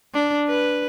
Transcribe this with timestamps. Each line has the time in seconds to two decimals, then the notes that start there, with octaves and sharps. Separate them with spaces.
0.14 D4
0.48 B4